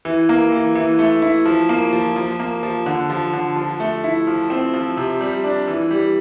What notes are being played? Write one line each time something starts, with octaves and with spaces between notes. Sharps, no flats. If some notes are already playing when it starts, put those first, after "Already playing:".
E3
A#3
E3
E3
A3
E4
F3
A#3
F3
F3
A#3
F3
D3
F3
D3
F3
A3
E4
F3
C4
F3
C3
G3
D4
E3
G3